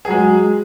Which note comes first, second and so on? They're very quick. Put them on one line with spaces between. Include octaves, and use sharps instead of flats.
G#4 F#3 G#3